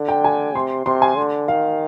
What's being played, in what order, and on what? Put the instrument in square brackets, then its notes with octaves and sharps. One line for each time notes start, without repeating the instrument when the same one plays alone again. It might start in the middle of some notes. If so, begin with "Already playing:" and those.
Already playing: [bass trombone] D3
[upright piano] G5
G#5
[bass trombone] C3 [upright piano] C6
[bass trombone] C3 [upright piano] C6
[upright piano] G#5
[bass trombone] D3
[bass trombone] D#3 [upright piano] F5